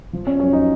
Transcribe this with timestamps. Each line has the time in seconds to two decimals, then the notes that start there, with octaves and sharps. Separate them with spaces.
0.13 F3
0.27 C#4
0.40 F#2 C#4
0.53 D#4